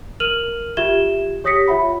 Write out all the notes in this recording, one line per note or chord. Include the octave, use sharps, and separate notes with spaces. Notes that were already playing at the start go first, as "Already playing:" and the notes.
A#4 F6 D#7 F7 F#7
F4 G4 E5 G#6 E7 G7
G4 C#5 D#6 A#6 B6 C#7
F4 C#5 E5 F#5 B5